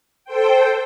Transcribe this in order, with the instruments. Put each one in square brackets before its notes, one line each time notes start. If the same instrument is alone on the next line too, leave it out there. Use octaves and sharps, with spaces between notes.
[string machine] A4 C5 G5